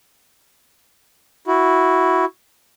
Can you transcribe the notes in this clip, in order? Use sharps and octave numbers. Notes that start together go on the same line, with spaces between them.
E4 F#4